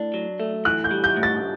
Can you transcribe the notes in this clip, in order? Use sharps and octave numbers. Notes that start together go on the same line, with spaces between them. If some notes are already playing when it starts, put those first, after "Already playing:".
Already playing: A2 D4
F#3
A3
E3 F#6
G6
G3
G6
A2
A6